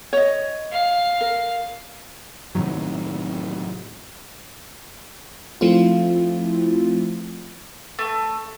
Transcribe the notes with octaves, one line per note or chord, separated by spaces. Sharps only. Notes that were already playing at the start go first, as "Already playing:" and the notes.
C#5 D#5
F5
A#4
A2 C3 D#3 F#3
F3 A3 C4 E4 F4
A3